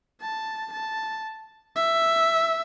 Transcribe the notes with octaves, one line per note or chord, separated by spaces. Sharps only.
A5
A5
E5